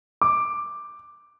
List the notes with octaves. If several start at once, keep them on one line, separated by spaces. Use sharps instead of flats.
D6